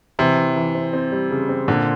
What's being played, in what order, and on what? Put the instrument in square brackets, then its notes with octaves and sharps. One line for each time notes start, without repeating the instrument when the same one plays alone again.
[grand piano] C3 [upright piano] E3
[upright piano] E3
E3
C4
C4
G3
C#3
C4
[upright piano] A#2 [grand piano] D3